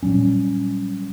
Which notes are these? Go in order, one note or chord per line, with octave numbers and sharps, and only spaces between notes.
A#2 F#3 G3 C#4